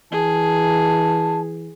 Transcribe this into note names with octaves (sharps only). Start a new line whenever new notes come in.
E3 G#4 A5